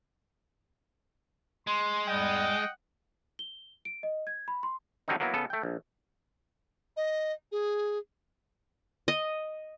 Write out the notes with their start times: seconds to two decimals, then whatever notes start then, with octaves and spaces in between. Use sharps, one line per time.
1.67 G#3 C6
2.08 E2 G#2 G3 D#5 F#5 G5
3.39 G7
3.85 D7
4.03 D#5
4.27 G#6
4.48 B5
4.63 C6
5.08 D3 F#3 G3 C4 C#4 D#4
5.20 F#3 A#3 B3 E4
5.34 C#3 B3 A4
5.50 A3 G5
5.63 A#1
6.97 D#5
7.52 G#4
9.08 D#5